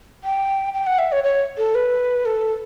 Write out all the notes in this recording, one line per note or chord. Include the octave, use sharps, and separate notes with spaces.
G5
G5
F#5
E5
C#5
C#5
A4
B4
A4